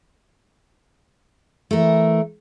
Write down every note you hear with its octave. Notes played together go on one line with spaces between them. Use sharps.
E3 A3 A#4